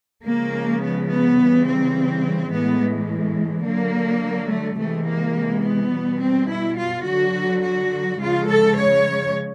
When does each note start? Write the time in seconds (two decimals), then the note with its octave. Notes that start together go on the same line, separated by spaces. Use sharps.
0.24 C#3 F3 G#3 A#3
0.81 B3
1.09 B3
1.37 C#3 E3 G3
1.66 C4
2.51 A2 E3 G#3 B3
3.65 D3 F#3 A#3
4.50 A3
4.79 C3 E3 G#3 A3
5.07 A#3
5.64 B3
5.93 B2 G3
6.21 C4
6.49 E4
6.78 F4
7.06 D3 F#3 F#4
7.63 F#4
8.20 C#3 F3 G#3 F4
8.48 A4
8.77 C#5